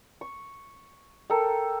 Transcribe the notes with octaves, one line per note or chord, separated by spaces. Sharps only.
C#6
A4 A#4 G5